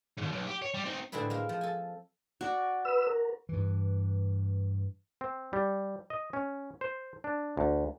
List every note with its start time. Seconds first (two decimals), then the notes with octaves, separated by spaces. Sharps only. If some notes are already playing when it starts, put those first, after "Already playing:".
0.17 D#2 G#2
0.32 B1
0.47 G4
0.62 C#5
0.74 G3
0.85 C4 D#4
1.12 A2 D3 C4 E4 G#4 B4
1.30 G#3 A#3 A#4
1.49 F3
1.61 A4 G#5
2.41 F#4 D5
2.85 B4 E6
3.07 A#4
3.49 G2 E3
5.21 C4
5.53 G3
6.10 D#5
6.33 C#4
6.81 C5
7.24 D4
7.57 D2